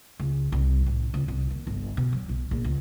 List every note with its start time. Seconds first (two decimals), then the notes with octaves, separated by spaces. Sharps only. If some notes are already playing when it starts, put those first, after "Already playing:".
0.20 C#2
0.52 C2
0.86 A1
1.14 C#2
1.28 C2
1.50 D#2
1.67 G1
1.97 B2
2.13 F#3
2.29 B1
2.51 A#1
2.64 C#2